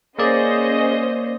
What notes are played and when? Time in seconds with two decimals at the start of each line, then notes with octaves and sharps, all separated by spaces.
0.19 A#3 C#4 G#4 C5 D5 D#5